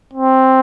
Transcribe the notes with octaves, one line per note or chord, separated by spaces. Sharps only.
C4